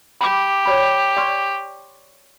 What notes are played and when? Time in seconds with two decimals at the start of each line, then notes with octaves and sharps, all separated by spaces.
0.21 G4 B5 D6
0.66 C#5 D5 B5
1.17 D5 C6 C#6